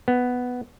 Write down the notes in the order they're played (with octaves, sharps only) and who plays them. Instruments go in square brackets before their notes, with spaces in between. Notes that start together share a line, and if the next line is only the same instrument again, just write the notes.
[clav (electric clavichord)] B3